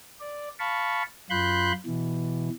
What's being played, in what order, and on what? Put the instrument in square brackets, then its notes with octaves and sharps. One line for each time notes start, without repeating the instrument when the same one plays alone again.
[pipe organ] D5
F5 A5 B5 C#6
F#2 F4 B5 C6 F#6 G6
B2 E3